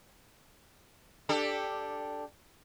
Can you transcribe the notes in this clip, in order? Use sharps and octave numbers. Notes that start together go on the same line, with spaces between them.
D4 G4 A4